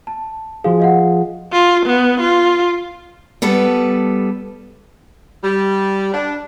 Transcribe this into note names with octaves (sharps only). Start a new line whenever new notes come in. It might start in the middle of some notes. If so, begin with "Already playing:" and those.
A5
F3 F4 F#4 G#4 F5
D#5 F5 F#5
F4
B3
F4
G3 B3 A4 B4
G3
D4